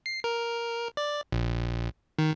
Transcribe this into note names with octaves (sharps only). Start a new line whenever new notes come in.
C7
A#4
D5
A#1
D#3